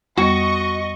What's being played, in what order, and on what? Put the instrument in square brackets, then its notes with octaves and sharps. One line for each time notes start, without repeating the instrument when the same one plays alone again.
[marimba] F2 G3 B3 [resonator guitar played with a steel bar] F#4 [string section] D#5 C#6